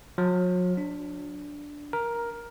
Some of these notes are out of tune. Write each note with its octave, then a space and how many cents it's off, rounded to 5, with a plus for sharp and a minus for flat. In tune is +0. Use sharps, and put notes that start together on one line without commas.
F#3 -40
D4 -5
A#4 +10